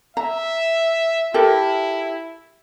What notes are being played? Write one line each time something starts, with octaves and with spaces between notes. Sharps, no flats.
E5 A#5
E4 G4 A4 A#4